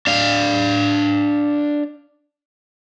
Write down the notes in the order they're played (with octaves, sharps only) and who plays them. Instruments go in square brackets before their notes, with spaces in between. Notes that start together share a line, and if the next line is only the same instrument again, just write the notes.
[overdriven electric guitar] D4 F5